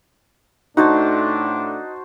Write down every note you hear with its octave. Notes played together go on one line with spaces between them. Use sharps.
A2 A3 D4 D#4 F#4 C5 A5